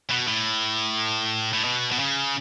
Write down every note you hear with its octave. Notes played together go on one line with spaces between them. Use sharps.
B2
A2
A2
B2
B2
C#3